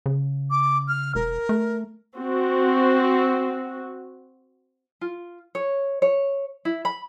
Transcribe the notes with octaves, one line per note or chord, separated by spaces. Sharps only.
C#3
D6
F6
E1 A#4
A3
C4 F#4
F4
C#5
C#5
E4
B5